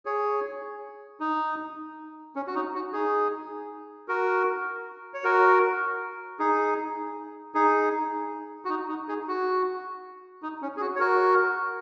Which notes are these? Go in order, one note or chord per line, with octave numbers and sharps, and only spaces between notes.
G#4 C#5
D#4
C#4
F#4
D#4
F#4
D#4 G#4
F#4 A#4
C#5
F#4 A#4
D#4 G#4
D#4 G#4
F#4
D#4
D#4
D#4 G#4
F#4
D#4
C#4
G#4
F#4
C#5
F#4 A#4